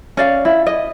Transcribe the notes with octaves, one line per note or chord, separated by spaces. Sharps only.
C#4 D5 F5
E4
D#5